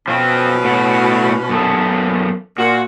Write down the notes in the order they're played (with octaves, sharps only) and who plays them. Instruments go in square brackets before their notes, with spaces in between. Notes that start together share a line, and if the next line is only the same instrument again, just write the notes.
[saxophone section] B2 C#4 [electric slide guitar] F3 C4
[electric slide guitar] A2 F#4
F#2 B3 A4
[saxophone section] A#2 [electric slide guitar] F#4